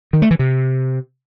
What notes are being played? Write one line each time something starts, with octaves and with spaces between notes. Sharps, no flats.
D#3
A3
E3
C3